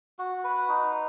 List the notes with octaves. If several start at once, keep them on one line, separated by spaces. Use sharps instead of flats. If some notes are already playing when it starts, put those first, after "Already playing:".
F#4
B4
D#4